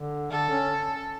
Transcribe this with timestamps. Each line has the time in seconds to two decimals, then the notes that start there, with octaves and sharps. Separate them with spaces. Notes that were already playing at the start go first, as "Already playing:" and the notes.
Already playing: D3
0.31 D3 A4
0.50 C#4